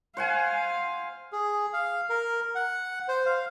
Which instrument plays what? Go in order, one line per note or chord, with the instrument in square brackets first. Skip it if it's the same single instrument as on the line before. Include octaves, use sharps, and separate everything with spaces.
[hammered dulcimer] C5 F#5 G#5 [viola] F5
[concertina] G#4
F5
A#4
F#5
C5
F5